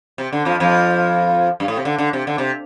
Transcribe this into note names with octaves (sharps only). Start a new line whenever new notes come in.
C3
D3
F2 F3
F2 F3
G2
A2
C3
D3
D3
C3
D3
C3